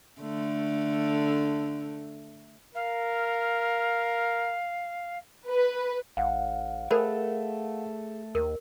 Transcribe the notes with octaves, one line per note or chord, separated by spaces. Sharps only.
D3 A3
A#4 F5
B4
A1 F5 F#5
A3 G#4 A#4 C5 B5
D#2 A#4